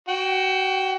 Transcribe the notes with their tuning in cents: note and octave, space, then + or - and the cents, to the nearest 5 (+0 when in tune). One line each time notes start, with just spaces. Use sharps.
F#4 +25 G5 +0